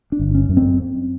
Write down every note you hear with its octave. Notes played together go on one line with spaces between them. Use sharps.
D4
G1
C#4
F#2
C4